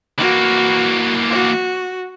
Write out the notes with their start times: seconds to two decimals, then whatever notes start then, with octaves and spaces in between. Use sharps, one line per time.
0.18 E3 A#3 F#4
1.29 F#4